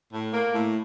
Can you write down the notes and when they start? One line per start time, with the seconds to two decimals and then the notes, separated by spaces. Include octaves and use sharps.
0.13 A2
0.33 A#3
0.52 A2